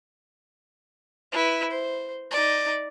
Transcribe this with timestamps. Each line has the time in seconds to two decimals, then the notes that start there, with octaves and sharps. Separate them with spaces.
1.32 E4 B4
1.70 C5
2.31 D#4 D5